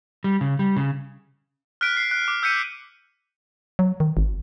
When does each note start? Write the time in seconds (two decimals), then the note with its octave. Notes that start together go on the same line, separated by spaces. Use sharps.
0.24 G3
0.41 C#3
0.59 G3
0.76 C#3
1.81 F6 F#6 B6 D7
1.97 C7
2.11 F#6
2.28 D6
2.43 E6 G6 B6 C#7 D#7
3.79 F#3
4.00 D#3
4.17 G#1